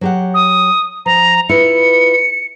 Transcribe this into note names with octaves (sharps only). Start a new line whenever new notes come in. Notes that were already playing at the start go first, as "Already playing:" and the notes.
F#3 G4 F#5
D#6
F3 A#5
E4 F4 B4 C#7